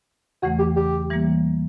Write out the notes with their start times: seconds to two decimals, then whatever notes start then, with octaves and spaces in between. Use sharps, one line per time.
0.42 E2 C#3 E3 A3 F#4
0.59 G4
0.76 G4
1.10 E3 G3 A#3